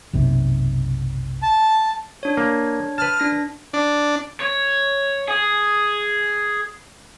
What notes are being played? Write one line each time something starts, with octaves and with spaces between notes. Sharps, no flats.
F#1 B1 C3
A5
D4 C#5
A#3
B4 A5 F6
D4 A#6
D4
C#5
G#4